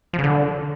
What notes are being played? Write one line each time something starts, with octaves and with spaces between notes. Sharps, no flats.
F3
C#3
D3